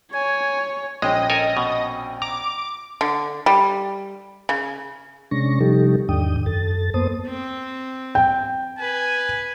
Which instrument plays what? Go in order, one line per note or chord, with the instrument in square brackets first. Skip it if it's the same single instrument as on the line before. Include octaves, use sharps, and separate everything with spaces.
[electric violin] C#5 [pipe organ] G#5
[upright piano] A#1 C#4 G5 [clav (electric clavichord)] G#3 [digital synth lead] D#5
[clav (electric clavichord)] A4 A#4 G#5
B2
[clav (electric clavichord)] A#5 [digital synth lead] D6
[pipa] D3
G3
C#3
[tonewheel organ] C3 G#3 C#4 D4 C#6 A#6
C3 F3 G3 D#4 G4 A4
E2 G#2 D#3 D4 G5 D#6
F#2 A4 A6
F#2 A#3 B3 C5 A5 D#6
[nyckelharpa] C4
[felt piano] G5
[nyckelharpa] B4 [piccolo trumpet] G#5